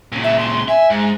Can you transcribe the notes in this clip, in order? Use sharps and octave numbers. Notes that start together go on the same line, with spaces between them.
A#2 C#3
E5
C6
E5 G#5
G#2